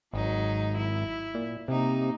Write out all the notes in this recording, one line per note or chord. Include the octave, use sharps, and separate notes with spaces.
G#1 F#3 D#4
E4
A#2
C3 A#3 D#4